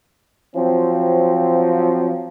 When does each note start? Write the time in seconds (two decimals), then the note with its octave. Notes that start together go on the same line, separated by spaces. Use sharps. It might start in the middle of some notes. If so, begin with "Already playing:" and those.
0.56 F3 F#3 C4